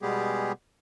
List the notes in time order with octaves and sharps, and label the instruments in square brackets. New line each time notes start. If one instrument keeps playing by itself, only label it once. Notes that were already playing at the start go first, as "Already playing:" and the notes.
[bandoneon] B2 G3 G#3 B3 G4 G#4